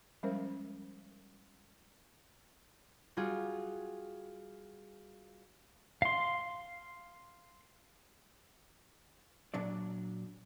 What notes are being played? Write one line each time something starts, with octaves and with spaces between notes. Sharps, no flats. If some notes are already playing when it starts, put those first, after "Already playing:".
F3 G3 G#3 C#4 A#4 C5
G3 F4 F#4 G#4
F5 C6
A#2 F#3 D4 D5